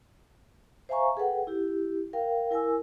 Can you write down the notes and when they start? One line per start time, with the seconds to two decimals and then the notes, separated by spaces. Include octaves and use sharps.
0.89 C5 E5 F5 G#5 A#5 C#6
1.17 G#4 A4 B4 F#5 G5
1.47 E4 G4
2.13 A#4 F5 G5
2.51 E4 A#4 G#5 E6